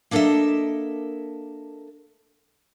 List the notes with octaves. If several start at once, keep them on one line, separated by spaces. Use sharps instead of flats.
A#3 D4 A4 A#4 D#5 E5